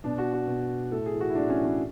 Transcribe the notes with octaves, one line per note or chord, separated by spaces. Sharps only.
B2 D4
F#4
F#4
B2
A2 A4
G#4
E3
F#4
E4
A2 D4
C#4
E3
C#4